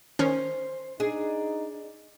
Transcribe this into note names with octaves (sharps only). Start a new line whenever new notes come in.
D#3 C#4 C5
D4 D#4 G#4